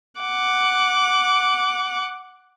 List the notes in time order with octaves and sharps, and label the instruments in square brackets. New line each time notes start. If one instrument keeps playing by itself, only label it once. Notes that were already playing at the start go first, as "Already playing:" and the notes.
[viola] F#5 D6